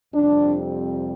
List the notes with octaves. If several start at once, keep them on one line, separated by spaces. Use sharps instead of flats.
F2 C3 G3 C4 D4